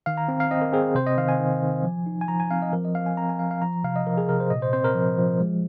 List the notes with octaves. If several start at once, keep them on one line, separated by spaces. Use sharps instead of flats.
D#3 F5
A#5
C4
F5
C4 D#5
A#4
C4 G#4
C3 C5
D#5
D#3 F5
G#5
D#3
D#3
F3
D#4
G#5
F3 A#5
G#5
C4 F5
D#5
F3 A#4
D#5
C4 F5
G#5
C4 A#5
G#5
F3 F5
F5
F3 A#5
C3 F5
D#5
F3 A#4
G#4
C3 A#4
C5
A#2 D#5
C5
C4 C5
A#4
F3
F3
G#3